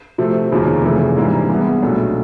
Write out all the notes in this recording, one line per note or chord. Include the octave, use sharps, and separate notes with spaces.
C3 F3 A3 C4
F1 D#2 C#3 F3 A#3
F1 F2 C#3 E3 A3
G#2 E3 G3 A#3 D4
G2 E3 G#3 B3
B1 A#2 F#3 A3 D4